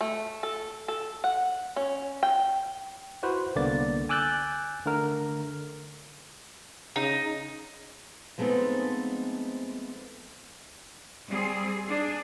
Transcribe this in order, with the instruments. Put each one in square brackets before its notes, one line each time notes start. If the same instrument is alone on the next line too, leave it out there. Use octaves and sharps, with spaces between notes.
[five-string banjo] A3
A4
A4
F#5
C#4
G5
[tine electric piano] E4 F#4 B4 C5
C2 D3 A#3 B3 D5 A6
G#5 D6 E6 F#6 G6 A6
D3 A3 A#4
[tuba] C#3 [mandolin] D#4
[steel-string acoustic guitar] F3 G#3 A3 B3 C4 D#4
[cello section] G3 C4 G#4
D4 G#4